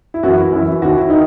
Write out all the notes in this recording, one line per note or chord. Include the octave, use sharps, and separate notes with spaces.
E4
F#2 E3 F#4
E4
F#2 E3
D#2 D#3 F#4
E4
D#3 D#4